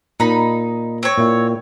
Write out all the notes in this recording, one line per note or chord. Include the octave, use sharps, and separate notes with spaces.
A#2 D#4 B5
C4 C#5
A#2 E4